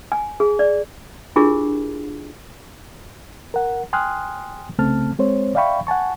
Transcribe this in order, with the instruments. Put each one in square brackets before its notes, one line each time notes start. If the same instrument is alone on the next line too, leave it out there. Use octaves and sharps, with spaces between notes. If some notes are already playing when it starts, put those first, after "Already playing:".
[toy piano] G#5
G#4
D5
D4 E4 F4 G4 G#4 A#4
[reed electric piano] A#4 F#5
G5 G#5 C6 D#6 F6 F#6
C2 C#3 A3 C4 A5 F6
G#3 C4 C5 C#5
D5 E5 F5 G5 B5 C#6
F#5 G#5 A5 C#6